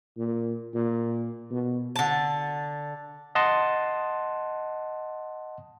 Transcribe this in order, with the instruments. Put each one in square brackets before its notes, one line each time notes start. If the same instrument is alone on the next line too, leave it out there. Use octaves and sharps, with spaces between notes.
[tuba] A#2
A#2
B2
[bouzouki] D3 A5
[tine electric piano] D#5 F#5 A5 C6